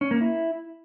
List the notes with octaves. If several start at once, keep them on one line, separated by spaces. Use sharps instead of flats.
C#4
A#3
E4